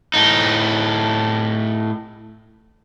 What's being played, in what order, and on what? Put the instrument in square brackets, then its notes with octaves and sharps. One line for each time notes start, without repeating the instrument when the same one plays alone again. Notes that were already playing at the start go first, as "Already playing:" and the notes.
[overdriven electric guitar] A2 D#4